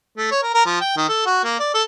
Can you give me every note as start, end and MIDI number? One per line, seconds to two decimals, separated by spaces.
0.17 0.28 57
0.31 0.42 73
0.43 0.52 70
0.54 0.63 70
0.66 0.80 53
0.81 0.96 79
0.97 1.06 51
1.09 1.21 69
1.26 1.39 66
1.44 1.57 58
1.59 1.74 74
1.74 1.83 69